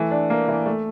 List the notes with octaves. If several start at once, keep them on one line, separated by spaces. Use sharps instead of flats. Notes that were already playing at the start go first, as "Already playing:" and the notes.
Already playing: E3 A3
D4
A#3
E3
A3